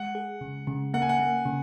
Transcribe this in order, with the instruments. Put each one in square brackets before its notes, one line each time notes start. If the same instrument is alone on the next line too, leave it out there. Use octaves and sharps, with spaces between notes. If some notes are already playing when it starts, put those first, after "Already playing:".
Already playing: [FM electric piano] G#3 [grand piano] F#5
[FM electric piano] G#4
C#3
C#3
[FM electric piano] A#3 [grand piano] F#5
[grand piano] G#5
F#5
[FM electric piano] A#3
C#3